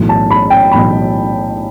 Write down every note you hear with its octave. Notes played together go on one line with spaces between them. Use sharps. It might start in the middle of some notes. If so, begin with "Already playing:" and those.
Already playing: B1 A2 E3
A5
B5
G5
B1 A2 E3 B5